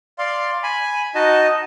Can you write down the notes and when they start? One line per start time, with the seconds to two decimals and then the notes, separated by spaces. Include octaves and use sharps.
0.18 D5 F5 C6
0.63 G#5 B5
1.15 D#4 F#4 D#5 A5